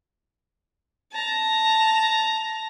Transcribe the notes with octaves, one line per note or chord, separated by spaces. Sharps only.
A5 A#5